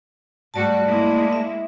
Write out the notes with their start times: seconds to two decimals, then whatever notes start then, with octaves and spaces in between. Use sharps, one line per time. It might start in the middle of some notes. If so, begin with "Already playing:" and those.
0.54 G#2 G3 A3 F#4 D5 A5
0.86 G#3 A#3 E4
1.33 E5